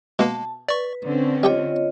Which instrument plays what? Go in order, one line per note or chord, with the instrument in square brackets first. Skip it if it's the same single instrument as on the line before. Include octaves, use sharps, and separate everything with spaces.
[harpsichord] B2 [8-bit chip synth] G#3 A#3 [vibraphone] A5
[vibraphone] B4 [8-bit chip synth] D5 C#6
[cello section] D3 C4 C#4
[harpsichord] G3 G4 G5 [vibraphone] F4 C#5 D#5